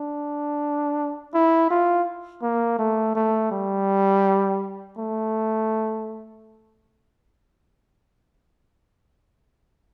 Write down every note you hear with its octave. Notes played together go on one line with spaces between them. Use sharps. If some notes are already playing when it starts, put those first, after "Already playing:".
Already playing: D4
E4
F4
A#3
A3
A3
G3
A3